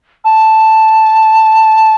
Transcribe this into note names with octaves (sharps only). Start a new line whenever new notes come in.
A5